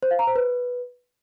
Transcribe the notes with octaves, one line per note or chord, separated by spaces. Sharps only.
C5
F5
A#5
C5
B4